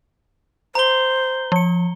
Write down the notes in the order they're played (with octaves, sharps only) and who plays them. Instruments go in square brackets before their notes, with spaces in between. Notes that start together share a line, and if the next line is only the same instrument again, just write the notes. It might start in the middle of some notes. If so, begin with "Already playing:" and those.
[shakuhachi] C5 [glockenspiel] A#5 G7
[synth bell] F3 C#7